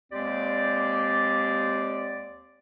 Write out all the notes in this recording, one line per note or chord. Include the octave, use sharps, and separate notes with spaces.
D#2 G#3 C4 G4 D5